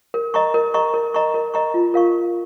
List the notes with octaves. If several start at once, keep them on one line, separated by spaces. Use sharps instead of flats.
A#4
D#5 A#5 C#6
A#4
D#5 A#5 C#6
A#4
D#5 A#5 C#6
A#4
D#5 A#5 C#6
F4
A#4 F5 C#6